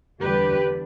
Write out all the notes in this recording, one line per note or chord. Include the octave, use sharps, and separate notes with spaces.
E2 D3 G3 D4 G4 B4